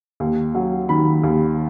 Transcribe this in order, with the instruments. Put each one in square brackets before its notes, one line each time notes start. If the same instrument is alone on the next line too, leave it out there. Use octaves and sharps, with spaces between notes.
[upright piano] D#2
F#3
D#3 B5
D#2